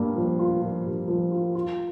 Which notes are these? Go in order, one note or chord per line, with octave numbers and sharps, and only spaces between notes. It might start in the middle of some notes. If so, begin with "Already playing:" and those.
Already playing: G2 A#3
F3
F4
F3
G2
F3
F4
F4